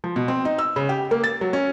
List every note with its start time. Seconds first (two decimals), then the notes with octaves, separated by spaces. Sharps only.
0.04 F3
0.16 B2
0.28 C4
0.45 D#4
0.58 E6
0.76 C#3
0.89 G4
1.11 A#3
1.24 A6
1.41 F#3
1.53 C#4